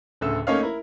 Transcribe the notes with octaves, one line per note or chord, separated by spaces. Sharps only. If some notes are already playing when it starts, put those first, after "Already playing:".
D1 D2 C#3 A4 E6
A3 A#3 C#4 D#4 C#5 F5
E4 A#4